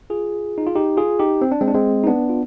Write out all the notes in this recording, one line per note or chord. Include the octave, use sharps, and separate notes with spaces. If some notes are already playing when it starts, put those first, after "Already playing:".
F4 G#4
D#4
F4
D#4 G4
F4 G#4
D#4 G4
C4
D4
G#3 C4
D4
G#3 C4
D#4
B3 D4
F4